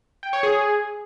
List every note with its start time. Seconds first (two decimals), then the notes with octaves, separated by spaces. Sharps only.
0.23 G5
0.33 C#5
0.43 G#4